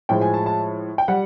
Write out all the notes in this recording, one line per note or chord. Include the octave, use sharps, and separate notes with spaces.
A2 F3 G#3 G5
G#5
A5
A5
G5
G3 F#5